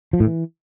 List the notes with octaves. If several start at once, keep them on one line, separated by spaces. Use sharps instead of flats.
F3
A2
E3